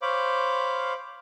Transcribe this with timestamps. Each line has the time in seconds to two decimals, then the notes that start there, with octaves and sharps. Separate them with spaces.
0.02 C5 C#5 F5 B5 D6